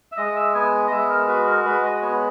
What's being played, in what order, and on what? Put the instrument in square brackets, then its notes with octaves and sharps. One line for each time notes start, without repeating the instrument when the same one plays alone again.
[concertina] E5
G#3 D#5
E5
B3 G#5
D#5
G#3 E5
A#4
F#4 B4
A#4
G#3 B4
D#5
B3 C#5